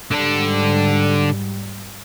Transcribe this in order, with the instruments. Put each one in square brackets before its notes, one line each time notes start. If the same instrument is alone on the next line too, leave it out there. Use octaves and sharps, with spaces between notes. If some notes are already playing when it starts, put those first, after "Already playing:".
[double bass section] G#2 G3 [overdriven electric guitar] D3 D4